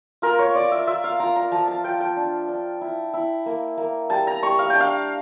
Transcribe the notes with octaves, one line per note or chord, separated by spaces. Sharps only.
F4 A#4
C#5
F4 D5
E5
F4 E5
F5
F4 A#5
A#5
F3 A5
A5
F4 G5
G5
D4
D4
E4
E4
A#3
A#3
G3 A5
A#5
G3 C#6
F5
G5
D4
F5